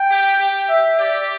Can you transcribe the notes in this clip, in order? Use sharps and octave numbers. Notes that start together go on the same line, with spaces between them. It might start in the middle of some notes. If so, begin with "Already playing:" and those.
Already playing: G5
G4
G4
E5
G4 D5